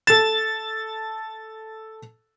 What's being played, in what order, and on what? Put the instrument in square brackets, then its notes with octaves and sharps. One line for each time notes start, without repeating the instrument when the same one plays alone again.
[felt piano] A4 E7 [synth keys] A6